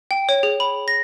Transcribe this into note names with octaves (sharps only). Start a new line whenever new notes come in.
G5
C#5
G#4
B5
A#6